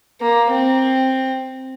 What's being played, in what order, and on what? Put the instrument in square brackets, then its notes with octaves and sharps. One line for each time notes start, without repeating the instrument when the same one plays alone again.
[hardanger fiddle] A#3
C4